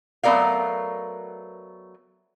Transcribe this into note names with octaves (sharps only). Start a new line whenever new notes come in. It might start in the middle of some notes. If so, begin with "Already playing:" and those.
F#3 A3 B3 A#4 D5 F5